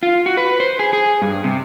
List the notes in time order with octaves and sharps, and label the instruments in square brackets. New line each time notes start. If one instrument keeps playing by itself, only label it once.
[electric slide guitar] F4
F#4
B4
C5
G#4
G#4
G2
C3